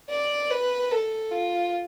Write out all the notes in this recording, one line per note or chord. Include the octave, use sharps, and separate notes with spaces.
D5
B4
A4
F4